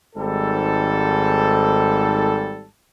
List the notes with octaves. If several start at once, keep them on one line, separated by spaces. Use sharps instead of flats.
G#1 G#2 G3 A4